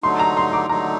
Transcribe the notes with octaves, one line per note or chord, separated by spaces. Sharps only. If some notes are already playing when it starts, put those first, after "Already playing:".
D3 F#3 A3 D#4 C6
A#5
C6
D6
D3 F#3 A3 D#4 A#5